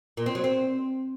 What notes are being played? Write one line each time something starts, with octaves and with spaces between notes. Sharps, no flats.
A#2
C4
F#3
C4